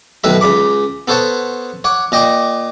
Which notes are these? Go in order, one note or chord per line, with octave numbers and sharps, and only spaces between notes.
B1 A2 D#3 B4 E5 B5
C#2 C#3 B5 D6
B3 A4 C5 C#5 F#5 A5
C#5 F#5 D6
A#2 D#5 G5 D6